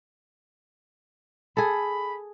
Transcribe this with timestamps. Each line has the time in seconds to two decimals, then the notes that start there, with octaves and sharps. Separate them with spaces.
1.57 G#4 A4 B5